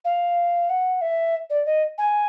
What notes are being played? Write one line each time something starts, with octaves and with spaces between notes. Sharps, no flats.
F5
F#5
E5
D5
D#5
G#5